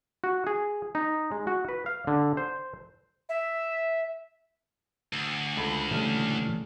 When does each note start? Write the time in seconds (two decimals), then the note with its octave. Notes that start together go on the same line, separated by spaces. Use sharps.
0.24 F#4
0.47 G#4
0.95 D#4
1.32 G#3
1.47 F#4
1.69 B4
1.86 F5
2.07 D3
2.37 C5
3.29 E5
5.13 D2
5.57 C#2 A4 B5
5.91 A#2 C#3 E3 G3 A3 F6